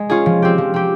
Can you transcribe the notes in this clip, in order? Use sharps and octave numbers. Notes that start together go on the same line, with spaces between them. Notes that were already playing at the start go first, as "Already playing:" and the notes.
Already playing: G#3
C#4 F4 G#4
F3
C4 G4
F3
C4 G4